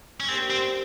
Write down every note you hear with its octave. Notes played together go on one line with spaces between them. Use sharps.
C#4
A#3 C4 D4 G4 C5
C4